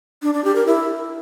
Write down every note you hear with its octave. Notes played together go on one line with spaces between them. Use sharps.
D4
D4
G4
A#4
E4